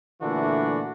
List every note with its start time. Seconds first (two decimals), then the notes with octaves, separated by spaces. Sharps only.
0.22 A#2 D3 E3 A3 D4 F#4